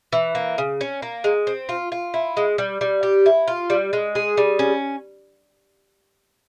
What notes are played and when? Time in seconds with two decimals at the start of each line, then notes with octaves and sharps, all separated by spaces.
0.13 E3
0.35 A#3
0.58 C#3
0.81 C#4
1.02 A#3
1.24 G#3
1.47 C4
1.69 F4
1.92 F4
2.14 E4
2.37 G#3
2.58 G3
2.81 G3
3.03 G4
3.26 E4
3.48 F4
3.70 G3
3.93 G#3
4.15 G#4
4.37 G3
4.59 C#4